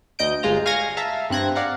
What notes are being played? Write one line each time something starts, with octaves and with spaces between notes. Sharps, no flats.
D2 D#5 G6 D7
G1 G#3 F4 A#5
F5 G#5 C#6 F6 G#6 A#6
E5 F5 A5 A#5
G2 C4 F#6 G#6 A#6
D5 F5 F#5 A#5